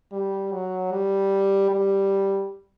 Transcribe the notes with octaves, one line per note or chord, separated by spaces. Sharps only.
G3
F#3
G3
G3